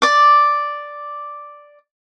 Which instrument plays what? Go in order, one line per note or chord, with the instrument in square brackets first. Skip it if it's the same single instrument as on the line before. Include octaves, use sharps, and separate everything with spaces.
[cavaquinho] D5 D6